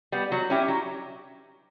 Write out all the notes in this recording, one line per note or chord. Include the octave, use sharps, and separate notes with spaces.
G3 B3
F#3
C#4 E4 G4
F#3